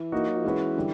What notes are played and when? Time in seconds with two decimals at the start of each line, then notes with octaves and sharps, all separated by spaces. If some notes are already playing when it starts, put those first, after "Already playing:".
Already playing: E3
0.12 A#3 D#4 F#4
0.28 F#3
0.36 F3
0.44 E3 G#3 C#4 F#4 B4
0.76 D3 G3